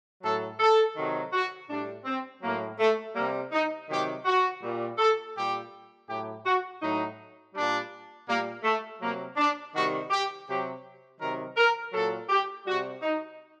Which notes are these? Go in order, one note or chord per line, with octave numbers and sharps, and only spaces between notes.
A2 F#3 A4
A4
C3 D#3 F#3
F#4
A2 G3 D4
C4
A2 F#3 A#3
A3
C3 G3 A#3
D#4
C3 D#3 F#3 G4
F#4
A#2 G3
A4
A#2 G3 G4
A2 F#3 G4
F#4
A2 F#3 D#4
A#2 G3 D4
A#2 G3 A#3
A3
C3 F#3 A#3
D4
C3 D#3 G3 F#4
G4
C3 F#3 G4
C3 D#3 F#3 A#4
A#4
A#2 F#3 A4
G4
C3 G3 F#4
D#4